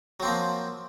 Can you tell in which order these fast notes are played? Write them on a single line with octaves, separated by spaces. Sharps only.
F#3 C4 A#3 F3